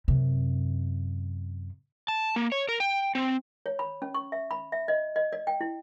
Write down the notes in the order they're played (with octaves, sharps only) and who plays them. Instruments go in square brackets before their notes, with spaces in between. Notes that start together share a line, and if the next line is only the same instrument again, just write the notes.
[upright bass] F#2 C3
[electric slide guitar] A5
A#3
C#5
A#4
G5
C4
[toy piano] C#5
B5
C#4
C#6
E5
B5
E5
D#5
D#5
D5
G5
E4